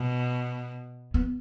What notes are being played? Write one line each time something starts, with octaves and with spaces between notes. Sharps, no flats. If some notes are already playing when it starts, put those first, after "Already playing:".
Already playing: B2
B3